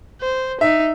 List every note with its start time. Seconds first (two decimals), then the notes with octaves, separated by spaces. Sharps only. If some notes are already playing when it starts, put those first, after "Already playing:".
0.21 C5
0.61 D#4 E5